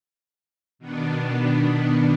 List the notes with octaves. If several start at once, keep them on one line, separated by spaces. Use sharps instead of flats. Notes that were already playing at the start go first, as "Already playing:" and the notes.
B2 D#3 B3 D4